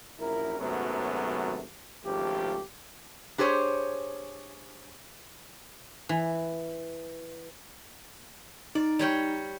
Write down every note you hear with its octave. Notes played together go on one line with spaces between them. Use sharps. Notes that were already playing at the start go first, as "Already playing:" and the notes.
A#1 F#2 E4 A#4
G#1 F#2 C3 F#3 A3 B3
G#1 C#2 F3 A3 G4
D4 G4 G#4 C5 C#5
E3
D#4 D5
G3 C#5 G5